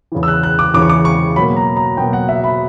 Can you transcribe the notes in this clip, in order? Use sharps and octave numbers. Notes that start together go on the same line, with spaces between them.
E2 C#3 E3
E6
F#6
F#6
D6
E2 C#3 E3 D6
C#6
D6
C#6
B2 F#3 A#3 B5
A#5
A#5
B2 F#3 A#3 G5
F#5
E5
B5